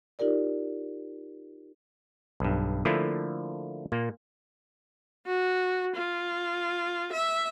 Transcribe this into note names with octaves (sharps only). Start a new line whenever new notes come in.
D#4 F4 G4 A#4 D5
B1 G2
D3 F3 A3 A#3 E4 F4
A#2 A#3
F#4
F4
E5